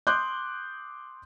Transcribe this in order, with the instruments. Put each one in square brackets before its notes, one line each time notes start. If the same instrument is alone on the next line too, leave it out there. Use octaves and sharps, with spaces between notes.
[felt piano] C6 D6 D#6 F#6 G6